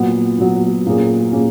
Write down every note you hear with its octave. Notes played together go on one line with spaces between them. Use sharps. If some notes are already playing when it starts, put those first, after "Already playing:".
Already playing: A#2 F#3 B3
A#2 F#3 B3
A#2 A#3 C#4 G#4
A#2 A#3 C#4 G#4